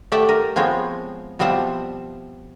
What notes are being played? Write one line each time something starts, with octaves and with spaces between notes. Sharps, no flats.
A3 G4 D5 E5 F#5 G5
A#4
F3 G#3 B3 C4 C#5
B2 F3 G3 C4 E5 F#5